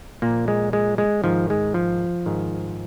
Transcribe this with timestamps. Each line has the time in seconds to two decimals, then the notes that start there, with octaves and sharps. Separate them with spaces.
0.22 A#2 A#3
0.27 F3
0.48 G#3
0.73 G#3
0.98 G#3
1.24 G#2 D#3 F3
1.50 G#3
1.74 F3
2.26 G#2 D#3